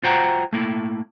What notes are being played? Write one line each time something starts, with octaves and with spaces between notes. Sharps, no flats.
F4 F#4 C5 F#5 G5 A#5
A3 A#3 E4